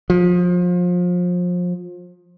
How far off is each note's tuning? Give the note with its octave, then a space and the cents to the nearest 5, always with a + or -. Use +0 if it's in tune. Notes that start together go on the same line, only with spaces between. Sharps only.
F3 +30